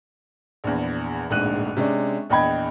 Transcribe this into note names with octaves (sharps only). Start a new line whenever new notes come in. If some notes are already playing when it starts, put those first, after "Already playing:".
A#1 E2
D1 A#1 G#2 F#6 D#7
C3 G#3 C#4 D4
A#1 E2 D#5 G5 B5 G#6